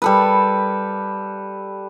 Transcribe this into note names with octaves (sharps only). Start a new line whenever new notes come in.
G3 A4 B4